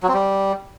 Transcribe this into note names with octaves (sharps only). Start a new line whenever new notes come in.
F#3
C4
G3